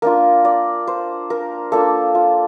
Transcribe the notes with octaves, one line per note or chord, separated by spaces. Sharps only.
A#3 D4 F4 A#4
D5
C5
A#4
A#3 D4 F4 A4
F4